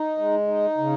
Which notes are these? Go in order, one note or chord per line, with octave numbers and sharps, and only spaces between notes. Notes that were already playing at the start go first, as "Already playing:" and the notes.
Already playing: D#4
G#3
D#4
C#3